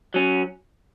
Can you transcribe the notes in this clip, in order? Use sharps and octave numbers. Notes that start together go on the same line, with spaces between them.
F#3 C#4